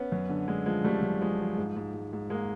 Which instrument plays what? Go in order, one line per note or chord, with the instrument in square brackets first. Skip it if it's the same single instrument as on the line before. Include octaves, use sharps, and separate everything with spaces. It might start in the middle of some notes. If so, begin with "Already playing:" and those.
Already playing: [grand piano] B3 C#4
F#2
D3
D3 G#3
F3 G#3
F#2 G3 A3
F#2
F3 G#3
F3
G#2
G#2
G#2
G#2
G#2 G#3 A#3